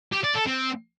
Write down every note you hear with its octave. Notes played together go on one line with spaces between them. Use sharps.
G4
D5
A4
C4